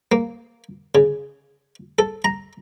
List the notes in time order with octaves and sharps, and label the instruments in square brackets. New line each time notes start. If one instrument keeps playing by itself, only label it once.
[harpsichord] A#3
C#3
A4
A#5